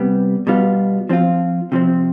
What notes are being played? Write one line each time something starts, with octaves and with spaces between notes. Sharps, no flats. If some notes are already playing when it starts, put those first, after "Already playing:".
Already playing: C3 G3 B3
B2 G3 B3 F4
F3 C4 F4
C3 F3 C4